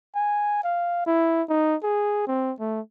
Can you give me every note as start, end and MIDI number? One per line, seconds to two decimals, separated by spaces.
0.16 0.60 80
0.64 1.06 77
1.06 1.43 64
1.49 1.76 63
1.83 2.23 68
2.27 2.52 60
2.60 2.81 57